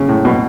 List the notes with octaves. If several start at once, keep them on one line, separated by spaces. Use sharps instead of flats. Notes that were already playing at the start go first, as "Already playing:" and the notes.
Already playing: C#3
A2
B2